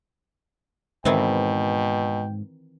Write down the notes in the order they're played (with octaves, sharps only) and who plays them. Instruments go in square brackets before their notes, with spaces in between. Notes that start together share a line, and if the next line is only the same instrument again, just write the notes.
[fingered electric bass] G#2 [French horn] B2 [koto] D#3 E3 C4 [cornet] G5